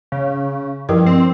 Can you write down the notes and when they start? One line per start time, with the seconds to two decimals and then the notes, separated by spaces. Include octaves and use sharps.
0.12 C#3
0.89 G2 F3 E4 A#4
1.06 C4